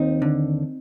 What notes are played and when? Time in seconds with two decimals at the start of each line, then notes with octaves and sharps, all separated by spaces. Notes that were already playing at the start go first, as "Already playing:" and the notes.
Already playing: D#2 C4 D#4
0.22 D3